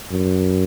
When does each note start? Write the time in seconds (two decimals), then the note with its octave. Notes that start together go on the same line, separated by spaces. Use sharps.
0.11 F#2